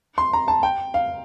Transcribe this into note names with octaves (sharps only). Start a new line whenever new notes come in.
C6
A#5
A5
G5
F5